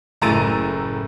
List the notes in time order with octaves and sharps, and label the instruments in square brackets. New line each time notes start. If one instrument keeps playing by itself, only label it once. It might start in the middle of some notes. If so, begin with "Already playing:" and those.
[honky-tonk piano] F#1 A2 A#5 E6 A6 D#7